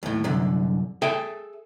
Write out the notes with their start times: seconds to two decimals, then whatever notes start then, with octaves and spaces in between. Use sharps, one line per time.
0.03 D#2 A2
0.24 C2 F#2 D3
1.02 G#4 A4 E5 G5